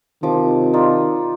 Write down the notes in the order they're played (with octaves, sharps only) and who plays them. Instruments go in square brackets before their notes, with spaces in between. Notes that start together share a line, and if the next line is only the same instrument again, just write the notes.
[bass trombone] C3 [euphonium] D#3 [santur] F3 D#5 D6
[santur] D#4 F4 D5